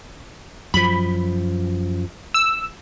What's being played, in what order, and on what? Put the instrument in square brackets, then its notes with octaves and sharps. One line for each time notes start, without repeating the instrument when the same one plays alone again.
[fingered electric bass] F#2 F3 [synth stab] B5
[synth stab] E6